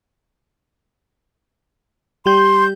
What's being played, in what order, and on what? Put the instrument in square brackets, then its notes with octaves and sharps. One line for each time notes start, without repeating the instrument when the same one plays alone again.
[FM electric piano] G3 G4 G6 [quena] C6